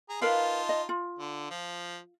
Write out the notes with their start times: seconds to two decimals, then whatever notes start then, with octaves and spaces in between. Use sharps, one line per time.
0.09 G#4 A#5
0.22 D#4 F4 A#4 B4 F5 A5
0.69 D#5
0.89 F4
1.19 D3
1.50 F3